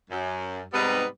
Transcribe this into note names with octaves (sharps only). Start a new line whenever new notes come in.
F#2
G#2 C3 G3 B3 D#4 B4